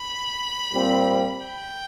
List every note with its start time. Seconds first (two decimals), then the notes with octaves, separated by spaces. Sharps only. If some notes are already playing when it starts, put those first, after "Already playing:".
Already playing: B5
0.72 A#2 G3 C4
1.46 G5